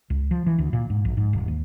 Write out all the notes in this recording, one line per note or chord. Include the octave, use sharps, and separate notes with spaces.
C#2
F3
E3
D2
A#2
G#2
A#1
G#2
D#1
D#2